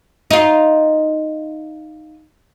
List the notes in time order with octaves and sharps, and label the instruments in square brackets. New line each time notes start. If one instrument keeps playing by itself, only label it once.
[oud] D#4 F4